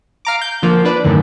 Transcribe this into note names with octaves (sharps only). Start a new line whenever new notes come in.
F5 A#5 D6
G6
D3 F3 A#3
D4 B4 D5
F#2 A2 D3 D#3